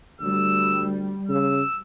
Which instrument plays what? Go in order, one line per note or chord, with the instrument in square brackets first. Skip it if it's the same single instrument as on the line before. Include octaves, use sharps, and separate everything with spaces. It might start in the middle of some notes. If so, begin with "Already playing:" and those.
[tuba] D2 [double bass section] G3 [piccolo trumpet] E6
[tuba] C#3 [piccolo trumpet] E6